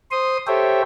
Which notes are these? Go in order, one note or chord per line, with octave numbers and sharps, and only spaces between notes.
C5 C6 D#6
G4 A4 C5 C#5 E5 G5